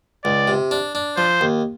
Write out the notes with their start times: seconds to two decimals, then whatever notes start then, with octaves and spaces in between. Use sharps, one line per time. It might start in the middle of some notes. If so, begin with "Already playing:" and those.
0.24 C#2 D5
0.48 C3
0.71 D4
0.95 D4
1.18 F3 C5
1.41 D#2